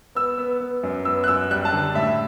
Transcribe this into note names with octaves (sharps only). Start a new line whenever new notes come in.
B3 E6
B3
B3
F#2
B3 E6
F#6
F#2 E6
G3 F#6
A5
D3
A2 E5